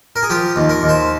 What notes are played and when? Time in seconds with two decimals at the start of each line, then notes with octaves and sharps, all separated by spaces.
0.16 A#4
0.23 G#4
0.30 F3 G4
0.56 D#2
0.69 A#4
0.82 D#2
0.89 C5